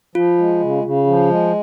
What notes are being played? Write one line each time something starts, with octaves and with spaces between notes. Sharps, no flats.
F3 F4
G#3
C#3
C#3
F3
G#3